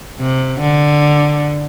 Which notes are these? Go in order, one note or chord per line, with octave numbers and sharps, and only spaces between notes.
C3
D3